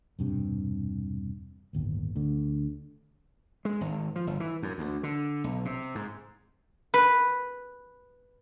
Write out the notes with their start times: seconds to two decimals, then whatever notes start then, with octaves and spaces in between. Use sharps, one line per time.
0.19 E1 G2 C3
1.73 D1 G1 D#2
2.16 D2 D3
3.65 G#3
3.81 G#1
4.16 F3
4.27 G1
4.40 E3
4.62 F#2
4.78 D2
5.03 D3
5.44 B1
5.65 C3
5.95 G#2
6.94 B4